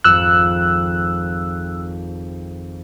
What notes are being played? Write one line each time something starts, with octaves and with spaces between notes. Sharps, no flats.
G#1 F2 E6 F#6 C#7